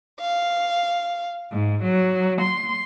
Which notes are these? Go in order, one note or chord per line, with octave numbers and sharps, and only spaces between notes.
F5
G#2
F#3
C6